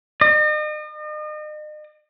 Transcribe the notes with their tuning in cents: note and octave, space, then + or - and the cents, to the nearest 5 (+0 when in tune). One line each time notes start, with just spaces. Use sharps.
D#5 -40